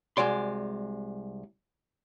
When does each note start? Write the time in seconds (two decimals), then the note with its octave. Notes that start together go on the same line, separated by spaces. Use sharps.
0.17 C2 A#2 G#3 F#4 D5 C6